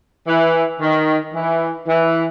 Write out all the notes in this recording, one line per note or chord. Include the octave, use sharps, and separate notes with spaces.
E3
D#3
E3
E3